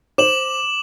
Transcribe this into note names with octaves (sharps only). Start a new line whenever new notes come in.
C5 D6 E7 F#7